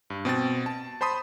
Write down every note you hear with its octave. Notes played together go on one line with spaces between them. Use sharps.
G2
B2 C4 G5 A6
A5
C5 A5 B5 C6 D#6